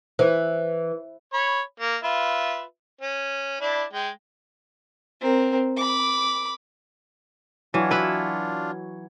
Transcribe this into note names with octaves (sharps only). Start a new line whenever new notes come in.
E3 C5
C#5 B5
A#3
F4 B4 E5
C#4
D4 E4 D5
G#3 G5
C4 A#4
B5 D6
E3 F#3 D4 F4 F#4 C#5
E4 B4